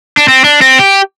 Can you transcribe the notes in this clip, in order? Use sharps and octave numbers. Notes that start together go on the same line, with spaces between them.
D4
C4
D4
C4
G4